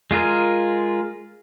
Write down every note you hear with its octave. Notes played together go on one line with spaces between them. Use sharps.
G#3 F4 G#4 A#4